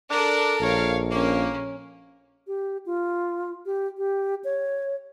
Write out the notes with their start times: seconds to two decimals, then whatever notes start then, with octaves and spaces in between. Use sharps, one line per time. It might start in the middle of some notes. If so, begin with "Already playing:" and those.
0.10 D4 A4 A#4
0.61 A#1 C#5 F5
1.11 A#3 C#4
2.47 G4
2.86 F4
3.66 G4
3.98 G4
4.44 C#5